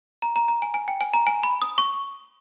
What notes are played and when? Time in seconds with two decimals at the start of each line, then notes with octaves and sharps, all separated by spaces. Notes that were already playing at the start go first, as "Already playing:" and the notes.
0.22 A#5
0.36 A#5
0.48 A#5
0.62 G#5
0.74 G#5
0.88 G5
1.01 G#5
1.14 A#5
1.27 G#5
1.43 B5
1.62 D#6
1.78 C#6